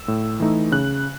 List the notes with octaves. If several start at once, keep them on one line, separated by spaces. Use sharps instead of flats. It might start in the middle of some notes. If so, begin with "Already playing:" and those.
Already playing: E6
A2
E3 A3 D#4
C#3 F#6